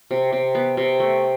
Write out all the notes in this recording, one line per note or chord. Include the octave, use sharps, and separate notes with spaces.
C3
C3
B3
C3
A3